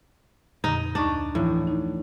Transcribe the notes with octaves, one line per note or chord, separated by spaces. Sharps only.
F2 A#2 D3 D#4
D2 D4 D#4 C#6
A2 E3 F3
D#4